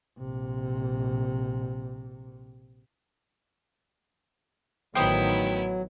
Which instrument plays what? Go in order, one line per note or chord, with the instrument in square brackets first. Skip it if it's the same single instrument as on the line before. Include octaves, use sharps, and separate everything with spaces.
[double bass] A#1 C3
[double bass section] A1 D#3 [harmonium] F#3 [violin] B3 E4 [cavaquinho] C5 G5 D#6